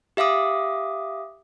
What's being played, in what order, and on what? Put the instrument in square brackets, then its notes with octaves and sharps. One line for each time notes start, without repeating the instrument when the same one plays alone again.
[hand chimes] G4 E5 F5 D6 D#6